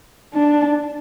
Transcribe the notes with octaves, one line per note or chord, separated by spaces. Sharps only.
D4